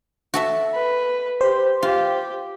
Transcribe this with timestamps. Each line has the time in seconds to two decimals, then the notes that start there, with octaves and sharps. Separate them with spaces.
0.34 F#4 A4 E5
0.75 B4
1.41 G4 C5
1.83 F4 G4